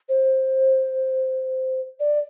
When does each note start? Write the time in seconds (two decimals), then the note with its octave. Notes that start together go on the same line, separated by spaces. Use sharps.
0.09 C5
2.00 D5